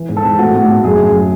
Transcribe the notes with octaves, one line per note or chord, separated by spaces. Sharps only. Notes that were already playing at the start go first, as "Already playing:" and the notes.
Already playing: E3
G#2
A4
G#2
A2 F#4
A2
A2
F#2 G#4
C#3